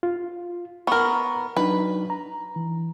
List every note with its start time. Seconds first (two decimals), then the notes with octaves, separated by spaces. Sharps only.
0.03 F4
0.87 B3 A#4 A#5 C#6
1.57 F#3 D4 D#4 B4
2.10 A#5
2.56 E3